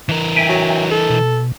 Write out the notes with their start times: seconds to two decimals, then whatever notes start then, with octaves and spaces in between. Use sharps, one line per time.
0.09 E3 A#4
0.36 E5 G5 G#5
0.49 F#3
0.91 A4
1.10 B2